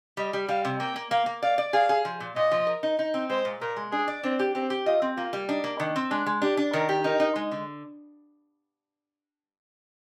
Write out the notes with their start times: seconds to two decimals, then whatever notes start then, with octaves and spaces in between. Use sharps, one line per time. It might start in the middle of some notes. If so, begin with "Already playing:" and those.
0.17 G3 D#5
0.33 G3
0.48 G3 F5
0.65 C3
0.80 A#3 G5
0.96 A#3
1.11 A#3 F5
1.26 A#3
1.43 D5 F5
1.58 D5
1.73 G#4 F5
1.89 G#4
2.05 F3
2.20 A#2
2.36 A#2 D#5
2.51 F3
2.67 A#4
2.83 D#4
2.99 D#4
3.14 C4
3.30 G#3 C5
3.45 A#2
3.61 A#2 A#4
3.76 G#3
3.92 D4 G#4
4.08 D5
4.23 C4 D4
4.39 G4
4.55 C4 G4
4.70 G4
4.86 F4 D#5
5.02 C4
5.16 A#3 F4
5.33 G3
5.48 D4 D#4
5.64 A#3
5.79 D#3 D4
5.96 C4
6.11 G#3 D4
6.26 G#3
6.42 D4 G4
6.57 D4
6.73 D#3 A#4
6.89 G4
7.04 D#4 A#4
7.20 D#4
7.36 G#3
7.51 D3